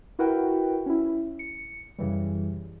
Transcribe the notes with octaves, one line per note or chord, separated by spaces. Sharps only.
E4 F#4 A#4 B4 F#5 G5
C#4 E4
C#7
F#2 C#3 E3 G3